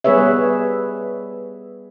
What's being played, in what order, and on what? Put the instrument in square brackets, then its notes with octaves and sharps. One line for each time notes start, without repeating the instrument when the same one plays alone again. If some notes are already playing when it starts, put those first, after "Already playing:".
[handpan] G3 B3 G#4 B4 C#5 E5